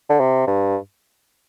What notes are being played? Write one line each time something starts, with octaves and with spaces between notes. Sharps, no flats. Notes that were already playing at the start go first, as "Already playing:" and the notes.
D3
C3
G2